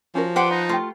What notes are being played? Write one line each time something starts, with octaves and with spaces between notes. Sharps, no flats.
F3 C#4 F#4 A#4
G4 B4 C5 F#5 D6
D#4 B5
A3 F4 G4